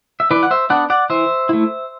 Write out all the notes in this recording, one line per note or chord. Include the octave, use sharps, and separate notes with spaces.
E5
E3 B4 D5
F#5
C5 E5
B3 D4 D5 F#5
D5 F#5
E3 C5 E5
A3 E4